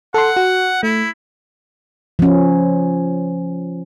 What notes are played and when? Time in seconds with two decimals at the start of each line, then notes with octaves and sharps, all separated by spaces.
0.14 A4 F#5 C6
0.37 F#4
0.83 A3 E4
2.19 F3 C#4